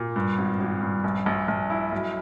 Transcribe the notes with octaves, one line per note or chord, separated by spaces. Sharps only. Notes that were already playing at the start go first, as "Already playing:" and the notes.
Already playing: A#2
G2
G#1
G#1
G2
A#1
A#1
A#1
E4
B1